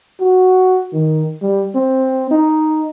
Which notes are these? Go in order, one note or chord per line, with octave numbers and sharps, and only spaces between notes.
F#4
D#3
G3
C4
D#4